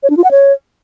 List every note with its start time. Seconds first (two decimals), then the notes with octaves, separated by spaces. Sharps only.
0.03 C#5
0.10 D4
0.17 F4
0.24 F#5
0.31 C#5